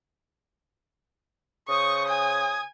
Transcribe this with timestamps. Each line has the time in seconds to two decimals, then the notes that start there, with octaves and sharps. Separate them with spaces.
1.69 C#3 C5 C#6 D#6
2.08 G#5